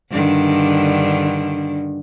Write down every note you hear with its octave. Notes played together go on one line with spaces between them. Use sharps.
G2 D3 D#3